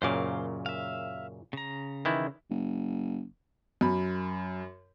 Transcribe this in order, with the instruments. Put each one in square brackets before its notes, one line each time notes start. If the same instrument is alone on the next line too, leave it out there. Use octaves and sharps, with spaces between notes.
[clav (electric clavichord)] F#2 A#2 C#3 [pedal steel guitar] C5 F5 D6
[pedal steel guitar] E5 F5
C#3 A#5
[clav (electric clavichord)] D#3 E3 E4
[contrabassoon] F#1
[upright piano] F#2 B5